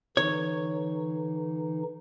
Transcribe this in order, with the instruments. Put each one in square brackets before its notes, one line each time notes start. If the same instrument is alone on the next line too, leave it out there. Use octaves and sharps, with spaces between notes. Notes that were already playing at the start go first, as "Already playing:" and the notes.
[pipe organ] D3 E3 D#4 [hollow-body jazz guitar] C#5